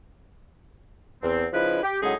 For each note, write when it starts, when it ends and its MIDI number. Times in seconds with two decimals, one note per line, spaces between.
1.23 1.47 40
1.23 1.47 60
1.53 1.83 49
1.53 1.83 53
1.53 1.83 63
1.53 1.83 64
1.53 1.83 71
1.84 1.97 67
2.03 2.14 45
2.03 2.14 49
2.03 2.14 54
2.03 2.14 56
2.03 2.14 63
2.03 2.14 68